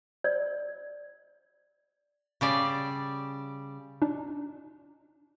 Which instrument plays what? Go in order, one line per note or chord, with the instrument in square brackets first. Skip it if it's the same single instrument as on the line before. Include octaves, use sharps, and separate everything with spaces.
[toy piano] D5
[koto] C#3 G3 D5
[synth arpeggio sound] D4 D#4